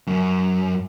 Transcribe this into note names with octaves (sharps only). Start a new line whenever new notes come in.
F#2